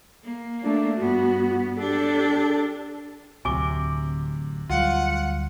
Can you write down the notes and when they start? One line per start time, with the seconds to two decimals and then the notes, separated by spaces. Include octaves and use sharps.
0.24 A#3
0.63 A3 D4
0.98 G2 B3 F#4
1.79 D4 G4 A4
3.45 D1 D2 C3 F#3 G#5 C#6 D6
4.70 D2 F#3 G3 F4 F#5